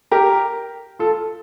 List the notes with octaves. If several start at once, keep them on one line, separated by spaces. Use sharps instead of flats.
G4 A#4
F4 A4